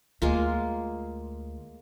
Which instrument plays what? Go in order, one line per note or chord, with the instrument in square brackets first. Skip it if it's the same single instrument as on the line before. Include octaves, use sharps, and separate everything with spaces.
[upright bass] D2 [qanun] G#3 A#3 F4